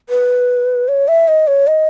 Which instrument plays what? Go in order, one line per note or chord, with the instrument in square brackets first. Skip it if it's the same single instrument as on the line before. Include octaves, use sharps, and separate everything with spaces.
[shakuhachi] B4
C#5
E5
D#5
C#5
D#5